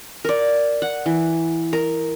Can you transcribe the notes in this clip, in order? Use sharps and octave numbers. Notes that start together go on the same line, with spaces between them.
A#4 D5
F#5
E3
A#4